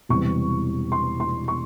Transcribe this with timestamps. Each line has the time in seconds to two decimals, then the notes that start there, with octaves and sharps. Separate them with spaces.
0.09 E1 E2 C3 E3 G3 C#6
0.92 C6
1.20 C6
1.48 C#6